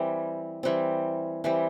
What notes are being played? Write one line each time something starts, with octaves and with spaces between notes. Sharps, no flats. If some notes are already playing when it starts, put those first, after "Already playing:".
Already playing: E3 G3 C4
E3 G3 C4
E3 G3 C4